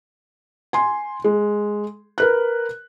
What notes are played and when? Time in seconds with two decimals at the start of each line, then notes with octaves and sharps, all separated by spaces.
0.73 G#5 C6
1.24 G#3
2.18 A#4 B4 F#6